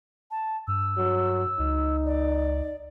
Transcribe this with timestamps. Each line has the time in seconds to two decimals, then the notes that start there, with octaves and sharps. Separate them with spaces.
0.31 A5
0.67 G2 E6
0.97 F#3
1.59 C#2 D#4
2.05 D5